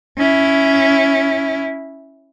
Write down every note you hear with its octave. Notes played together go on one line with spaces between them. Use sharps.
C#4 E4